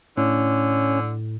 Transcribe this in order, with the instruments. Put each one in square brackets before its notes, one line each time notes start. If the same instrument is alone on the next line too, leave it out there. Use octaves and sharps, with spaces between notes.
[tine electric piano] A2 [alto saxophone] D3 [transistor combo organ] C#4